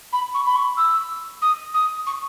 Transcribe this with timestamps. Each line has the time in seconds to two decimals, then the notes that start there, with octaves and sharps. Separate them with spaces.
0.12 B5
0.34 C#6
0.46 B5
0.55 C#6
0.77 E6
1.41 D#6
1.74 D#6
2.06 C#6